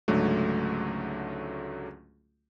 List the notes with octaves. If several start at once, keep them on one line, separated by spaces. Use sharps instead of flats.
C#2 G#2 D3 F#3 A3